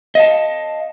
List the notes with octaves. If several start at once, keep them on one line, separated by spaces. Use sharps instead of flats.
D#5 F5 A5